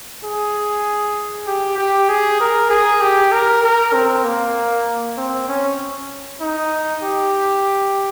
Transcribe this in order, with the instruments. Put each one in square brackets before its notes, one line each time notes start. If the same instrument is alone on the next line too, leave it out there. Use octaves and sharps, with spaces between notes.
[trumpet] G#4
G4
G4
G#4
A#4
G#4
G4
A#4
A#4
C4
A#3
C4
C#4
D#4
G4